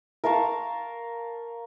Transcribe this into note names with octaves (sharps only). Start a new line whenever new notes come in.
A#4 F5 A5 C#6